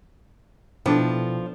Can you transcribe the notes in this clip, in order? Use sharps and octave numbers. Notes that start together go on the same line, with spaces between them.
B2 F3 B3 D4 E4 A4 G5